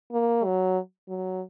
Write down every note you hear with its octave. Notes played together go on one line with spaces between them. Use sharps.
A#3
F#3
F#3